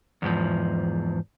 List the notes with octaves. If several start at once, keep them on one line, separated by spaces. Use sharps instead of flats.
E2 G#2 F3